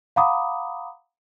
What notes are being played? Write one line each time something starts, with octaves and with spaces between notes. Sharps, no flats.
F5 F#5 A#5 B5 D6 D#6